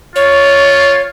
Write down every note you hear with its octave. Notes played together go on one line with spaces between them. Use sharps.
F4 C#5